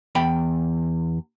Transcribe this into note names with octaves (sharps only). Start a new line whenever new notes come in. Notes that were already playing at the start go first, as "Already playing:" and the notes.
E2 G5 B5